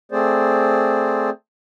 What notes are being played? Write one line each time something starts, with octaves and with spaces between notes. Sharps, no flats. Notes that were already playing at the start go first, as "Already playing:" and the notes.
A3 C4 G#4 C5 D5